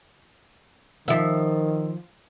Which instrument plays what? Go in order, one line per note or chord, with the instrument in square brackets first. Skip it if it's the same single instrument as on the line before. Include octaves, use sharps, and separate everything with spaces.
[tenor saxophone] D#3 [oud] F3 E5